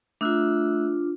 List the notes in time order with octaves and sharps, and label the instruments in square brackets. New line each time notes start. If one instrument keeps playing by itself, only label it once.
[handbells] A3 E6 F#6 [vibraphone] D4 F4